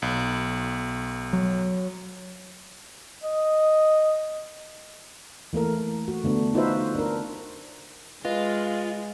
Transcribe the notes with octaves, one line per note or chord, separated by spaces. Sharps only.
B1
F#3
D#5
E3 A3 A#3 A#4
F#4
D3 A3 B3 D4
D#4 F4 F#4 B4 C5 E5
D4 A#4
G#3 F4 B4 D#5 F5